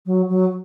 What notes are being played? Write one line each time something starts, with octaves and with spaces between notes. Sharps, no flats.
F#3
F#3